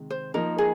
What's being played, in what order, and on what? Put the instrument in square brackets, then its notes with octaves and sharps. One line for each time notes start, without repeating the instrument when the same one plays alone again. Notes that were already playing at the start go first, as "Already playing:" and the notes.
Already playing: [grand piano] C3 D#3 G#3
[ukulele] C5
[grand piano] F3 A#3 D#4 [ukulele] A#4
[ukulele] G#4